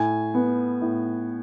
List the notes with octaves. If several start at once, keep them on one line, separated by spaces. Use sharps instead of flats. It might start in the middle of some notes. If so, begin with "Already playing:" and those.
Already playing: A2 G#5
B3
A2